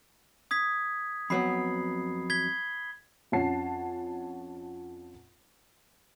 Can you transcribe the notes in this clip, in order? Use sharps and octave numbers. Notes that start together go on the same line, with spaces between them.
D#6 G#6 B6
F2 F#3 B3 B5 C7
G#6 B6 G7
F2 C#4 F#5 A5 C7